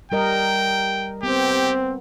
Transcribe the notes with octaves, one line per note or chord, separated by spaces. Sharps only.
G3 A#4 D#5 G5
B3 C4 G4